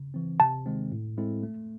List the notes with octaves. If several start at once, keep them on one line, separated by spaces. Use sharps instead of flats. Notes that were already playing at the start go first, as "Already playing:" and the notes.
Already playing: C#3
E3 C4
C3 A5
D#3 G#3 C4
A2
G#3 C4 E4 A4
A3